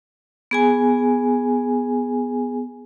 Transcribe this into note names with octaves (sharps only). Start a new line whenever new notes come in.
B3 G#4 G#5